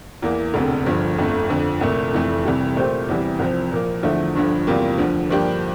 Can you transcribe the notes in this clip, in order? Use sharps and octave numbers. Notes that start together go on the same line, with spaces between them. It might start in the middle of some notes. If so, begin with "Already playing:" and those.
E2 E3 A#3
E1 D2 C3
G1 G2 F3
G1 F2 D3 A3
F2 D3 F3
C2 A#2 A3
F1 F2 E3 A3
C2 C3 E3 G3
A#2 A3 C4 G4 C5
E2 C3 E3 G3
C2 C3 F3 C4
A#2 F3 A#3
E2 D3 F3 A3 E4
G1 G2 D3 F3
E2 C3 G3 A#3 F4
D2 D3 F3
G2 F3 A#3 D4 G4